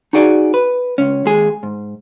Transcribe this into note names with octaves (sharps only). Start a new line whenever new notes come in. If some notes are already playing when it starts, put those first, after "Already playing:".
D#4 F#4 G#4 D5
B4
C#2 C#4
D#2 G#3 G#4
G#2